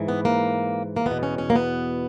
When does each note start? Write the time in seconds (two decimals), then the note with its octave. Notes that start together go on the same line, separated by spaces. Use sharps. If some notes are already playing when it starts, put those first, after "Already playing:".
Already playing: G#2 E3
0.08 B3
0.25 A#3
0.97 A#3
1.06 E2 B3
1.11 B2
1.23 C#4
1.38 C#4
1.50 A#3
1.56 B3